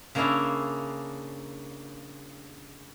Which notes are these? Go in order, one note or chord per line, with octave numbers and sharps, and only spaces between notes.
C#3 A#3 C#4 D4 E4